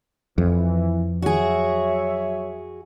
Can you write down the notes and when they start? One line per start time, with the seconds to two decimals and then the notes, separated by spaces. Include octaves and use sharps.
0.38 F2 E3
1.22 F#3 F#4 G#4 C#5 E5